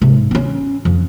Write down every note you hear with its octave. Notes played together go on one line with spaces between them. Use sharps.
G#2 C3
C4 C#4
F2